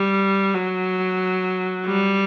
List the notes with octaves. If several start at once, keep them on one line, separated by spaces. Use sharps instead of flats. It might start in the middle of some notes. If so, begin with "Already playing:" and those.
Already playing: G3
F#3
G3